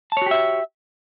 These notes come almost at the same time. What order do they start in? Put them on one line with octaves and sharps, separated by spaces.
A5 C#5 F#4 G4 E5